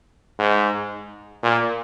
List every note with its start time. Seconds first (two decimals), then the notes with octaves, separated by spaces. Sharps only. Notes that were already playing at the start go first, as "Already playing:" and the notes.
0.39 G#2
1.43 A#2